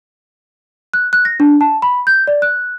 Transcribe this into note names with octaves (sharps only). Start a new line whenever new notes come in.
F#6
F#6
A#6
D4
A5
B5
G6
D5
F#6